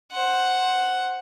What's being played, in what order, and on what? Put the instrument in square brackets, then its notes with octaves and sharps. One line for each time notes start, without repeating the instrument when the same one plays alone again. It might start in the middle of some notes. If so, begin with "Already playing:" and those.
[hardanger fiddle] C5 F#5